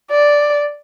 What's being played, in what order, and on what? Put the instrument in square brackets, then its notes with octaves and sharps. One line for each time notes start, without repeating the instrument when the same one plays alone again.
[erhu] D5